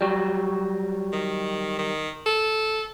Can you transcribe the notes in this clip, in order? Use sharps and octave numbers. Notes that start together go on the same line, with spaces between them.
F#3 G3
D#3
D#3
A4